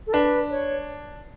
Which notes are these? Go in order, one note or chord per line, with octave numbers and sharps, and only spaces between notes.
A4
D4 B4
C#5